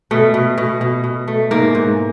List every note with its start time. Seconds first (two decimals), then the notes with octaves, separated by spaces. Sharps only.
0.11 B2 A3
0.34 B2
0.58 B2
0.81 B2
1.04 B2
1.28 A3
1.51 G#2 A#3
1.75 G#2